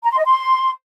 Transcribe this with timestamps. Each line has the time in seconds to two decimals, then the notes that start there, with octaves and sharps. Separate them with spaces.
0.04 A#5
0.11 C6
0.18 D#5
0.25 C6